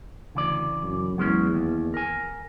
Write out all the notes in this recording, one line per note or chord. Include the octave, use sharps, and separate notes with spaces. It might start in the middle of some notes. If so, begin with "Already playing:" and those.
D2 C#3 E3 D5
F#2
E2 F#3 G#3 C#4
D#2
A#4 G#5